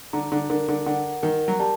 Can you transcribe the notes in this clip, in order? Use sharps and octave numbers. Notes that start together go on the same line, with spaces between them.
D3 A#5
D3
D3 A#4
D3
D3 F#5
D#3 A#4
F#3
G3 A5